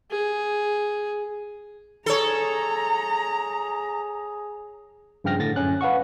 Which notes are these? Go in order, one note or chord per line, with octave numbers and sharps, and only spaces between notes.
G#4
G#4 A4 C#5 A#5
G2 C#3 F3 G5 F6 A#6
A2 D3 A6 A#6
F#2 C#4 F#6
B4 F5 F#5 C#6